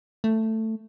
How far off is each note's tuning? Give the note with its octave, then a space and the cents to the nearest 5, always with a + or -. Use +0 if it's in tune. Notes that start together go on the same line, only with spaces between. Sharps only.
A3 +10